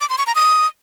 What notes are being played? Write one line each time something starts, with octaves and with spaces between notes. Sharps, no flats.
D6
C6
C#6
A#5
D#6